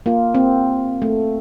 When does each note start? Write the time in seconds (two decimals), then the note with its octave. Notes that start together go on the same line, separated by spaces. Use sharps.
0.06 A#3 F4
0.34 C4
1.02 A3